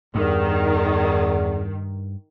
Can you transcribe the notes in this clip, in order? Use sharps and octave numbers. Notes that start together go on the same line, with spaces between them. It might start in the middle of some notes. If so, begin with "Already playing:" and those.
E2 G2 D#3